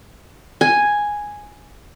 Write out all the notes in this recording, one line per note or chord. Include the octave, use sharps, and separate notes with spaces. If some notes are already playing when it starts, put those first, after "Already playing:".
G#5